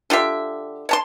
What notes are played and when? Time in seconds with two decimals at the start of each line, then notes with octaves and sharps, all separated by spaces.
0.10 D3 F4 G4 E5
0.89 C#5 A5 C6